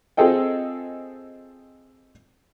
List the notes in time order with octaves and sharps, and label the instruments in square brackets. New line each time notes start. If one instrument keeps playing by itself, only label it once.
[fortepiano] C4 F4 G#4 A4 D#5 G5